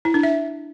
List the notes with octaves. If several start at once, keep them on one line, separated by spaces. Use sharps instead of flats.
E4
D4
E5